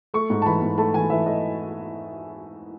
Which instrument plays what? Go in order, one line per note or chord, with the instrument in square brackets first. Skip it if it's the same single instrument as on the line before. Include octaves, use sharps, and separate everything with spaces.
[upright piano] A3 C#6
G#2
A5
E3 B5
G#2
A3 A5
E3 G#5
E3 E5
A3 D#5